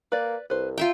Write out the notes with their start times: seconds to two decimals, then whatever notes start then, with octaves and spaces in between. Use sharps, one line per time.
0.12 A#3 B4 D5
0.50 C2 B4 C5
0.78 F4 E5 G5 A#5